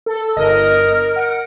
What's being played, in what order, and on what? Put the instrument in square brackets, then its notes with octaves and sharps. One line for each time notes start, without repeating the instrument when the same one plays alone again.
[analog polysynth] A4
[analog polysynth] G1 D#5 A#6 [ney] A#4
[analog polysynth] F#5 D7